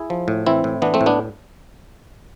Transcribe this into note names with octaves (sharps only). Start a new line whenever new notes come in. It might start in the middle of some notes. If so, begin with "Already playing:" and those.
Already playing: E4 G#4
F3
A2
E3 C4 E4
A2
E3 B3 D4
A3 C4
A2
B3 D4